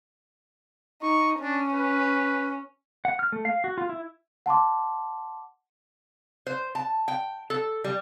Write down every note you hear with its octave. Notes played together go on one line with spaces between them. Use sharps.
D#4 C#6
C#4 D4
B4
F#5
F6
A3
F5
F#4
F4
E4
F#5 A5 C6 D6
C5
A5
G5
A4
G3